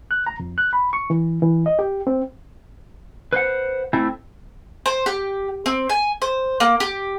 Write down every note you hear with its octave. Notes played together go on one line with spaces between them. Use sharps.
F#6
A#5
F2
F#6
B5
C#6
E3
E3
D#5
G4
C4
B4 C5 F#5
A3 C4 E4
C5
G4
C4
G#5
C5
A#3
G4